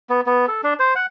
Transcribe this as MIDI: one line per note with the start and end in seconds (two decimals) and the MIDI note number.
0.09 0.21 59
0.26 0.46 59
0.48 0.61 69
0.63 0.74 62
0.80 0.94 72
0.95 1.06 78